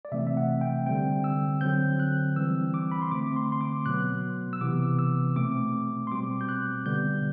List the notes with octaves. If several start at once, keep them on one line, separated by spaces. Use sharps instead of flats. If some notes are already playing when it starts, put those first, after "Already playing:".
D5
C3 E3 A3 C4 E5
E5
F#5
G5
D3 G3 C4 G5
E6
D3 F#3 C4 G6
F#6
E3 G3 C4 E6
D6
B5
C6
D3 A3 C4 D6
C6
C6
D6
B2 F#3 B3 F#6
E6
C3 E3 B3 D6
E6
B2 A3 C4 D6
C6
B2 G3 C4 D6
G6
F#6
D3 G3 B3 G6